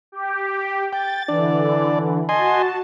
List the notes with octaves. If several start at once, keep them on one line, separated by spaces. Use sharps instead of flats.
G4
G5 A6
D3 E3 D4 D5
F#4 D#5 G#5 A5 C6